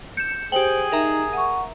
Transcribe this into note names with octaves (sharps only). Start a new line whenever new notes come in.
G6 C#7 E7
G4 G#4 C5 G5 F#7
D#4 A#4 E5 A#5
F#5 C#6 D#7